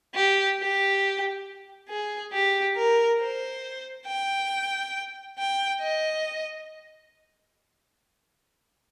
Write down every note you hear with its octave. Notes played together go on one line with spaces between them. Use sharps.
G4
G4
G#4
G4
A#4
C5
G5
G5
D#5